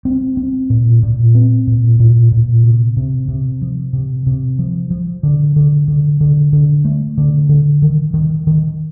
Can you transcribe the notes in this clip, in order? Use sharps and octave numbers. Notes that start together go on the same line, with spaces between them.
C4
C4
A#2
A#2
C4
A#2
A#2
A#2
C3
C3
C3
F3
C3
C3
F3
F3
D3
D3
D3
D3
D3
A3
D3
D3
D#3
D#3
D#3